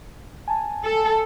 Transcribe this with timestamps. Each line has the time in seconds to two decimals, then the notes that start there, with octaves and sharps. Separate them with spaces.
0.48 G#5 A5
0.85 A4